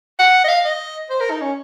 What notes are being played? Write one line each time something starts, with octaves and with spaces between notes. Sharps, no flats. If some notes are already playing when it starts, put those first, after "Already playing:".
F#5
D#5
F5
D#5
C5
A#4
D#4
C#4